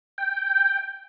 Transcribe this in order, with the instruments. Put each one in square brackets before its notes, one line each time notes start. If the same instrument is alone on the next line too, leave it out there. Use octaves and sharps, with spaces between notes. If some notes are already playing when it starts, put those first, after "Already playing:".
[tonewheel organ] G5